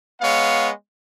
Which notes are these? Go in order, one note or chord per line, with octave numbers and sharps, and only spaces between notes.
G#3 B3 C#5 F5